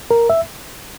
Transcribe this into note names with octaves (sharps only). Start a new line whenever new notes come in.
A#4
E5